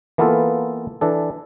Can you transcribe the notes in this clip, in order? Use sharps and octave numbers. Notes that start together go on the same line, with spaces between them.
E3 A#3 B3 F4 A4
E3 D4 A4